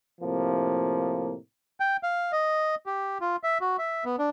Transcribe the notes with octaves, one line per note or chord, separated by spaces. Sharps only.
A2 C3 F3 A#3
G5
F5
D#5
G4
F4
E5
F#4
E5
B3
D4